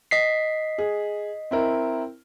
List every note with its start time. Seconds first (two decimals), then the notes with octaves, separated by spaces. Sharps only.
0.11 D#5 B6 C7
0.78 G#4
1.51 C4 E4 A#4